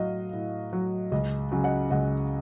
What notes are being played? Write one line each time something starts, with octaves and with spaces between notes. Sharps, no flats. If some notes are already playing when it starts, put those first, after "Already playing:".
Already playing: A2 F#3 D#5 F5
A2
F#3
C#2 D#5
C#3 F#3
D#5 F#5
C#2 D#5 F#5